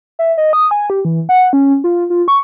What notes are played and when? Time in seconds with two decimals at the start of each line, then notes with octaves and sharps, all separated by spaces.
0.19 E5
0.38 D#5
0.53 D#6
0.71 G#5
0.90 G4
1.05 E3
1.29 F#5
1.53 C#4
1.84 F4
2.10 F4
2.28 C#6